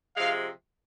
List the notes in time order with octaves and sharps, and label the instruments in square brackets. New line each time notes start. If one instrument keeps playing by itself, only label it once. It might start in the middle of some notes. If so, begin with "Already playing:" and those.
[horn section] C3 F3 G#3 F5